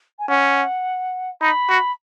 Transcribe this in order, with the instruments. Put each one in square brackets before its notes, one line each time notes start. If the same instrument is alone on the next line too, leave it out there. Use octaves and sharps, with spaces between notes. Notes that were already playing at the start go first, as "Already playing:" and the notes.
[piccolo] G#5
[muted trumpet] C#4 [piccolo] F#5
[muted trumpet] D#4 [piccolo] B5
[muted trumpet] F#4